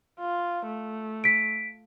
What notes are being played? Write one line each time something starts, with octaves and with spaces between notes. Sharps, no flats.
F4
A3
B6 D7